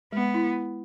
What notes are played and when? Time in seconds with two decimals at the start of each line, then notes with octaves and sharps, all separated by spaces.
0.12 G#3 B3
0.34 E4